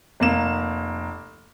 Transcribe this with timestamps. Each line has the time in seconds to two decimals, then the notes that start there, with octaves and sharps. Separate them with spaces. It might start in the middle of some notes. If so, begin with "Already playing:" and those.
0.20 F1 A#3 E7